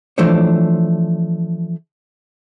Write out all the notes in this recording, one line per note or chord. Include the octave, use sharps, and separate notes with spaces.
E3 F3 A3 D4 C5 C#5